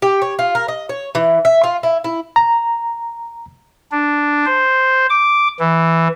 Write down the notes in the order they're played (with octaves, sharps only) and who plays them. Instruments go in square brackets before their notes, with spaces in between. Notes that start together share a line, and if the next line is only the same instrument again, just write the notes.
[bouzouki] G4
C#5
F4
A#4
D#5
C#5
E3
E5
F4
E4
E4
[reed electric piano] A#5
[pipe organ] D4
C5
D6
E3